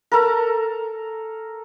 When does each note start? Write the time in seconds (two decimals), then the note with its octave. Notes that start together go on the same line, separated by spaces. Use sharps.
0.12 A4 A#4